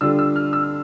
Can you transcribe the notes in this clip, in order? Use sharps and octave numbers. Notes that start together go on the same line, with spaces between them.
D3 G3 D4 F4 E6
E6
F6
E6